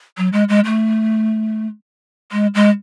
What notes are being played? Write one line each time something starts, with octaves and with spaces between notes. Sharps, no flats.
F#3
G#3
G#3
A3
G#3
G#3